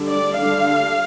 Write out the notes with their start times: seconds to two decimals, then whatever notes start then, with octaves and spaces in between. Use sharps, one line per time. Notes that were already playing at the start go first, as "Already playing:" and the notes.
Already playing: D3 G3 D4
0.10 D5
0.38 D3 G3 D4 F5